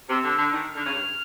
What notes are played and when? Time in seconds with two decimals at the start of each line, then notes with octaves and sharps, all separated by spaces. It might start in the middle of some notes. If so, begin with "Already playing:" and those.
0.10 C3 E6
0.24 D3
0.38 D3
0.52 D#3
0.66 F6
0.76 D3
0.86 C#3
0.95 G2